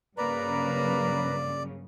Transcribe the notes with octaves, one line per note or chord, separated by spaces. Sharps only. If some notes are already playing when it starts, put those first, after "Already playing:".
G2 C#3 F#3 A#3 B4 D5 A#5